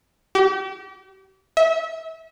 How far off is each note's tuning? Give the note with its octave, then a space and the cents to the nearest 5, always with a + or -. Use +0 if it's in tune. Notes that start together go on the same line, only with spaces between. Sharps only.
G4 -35
E5 -30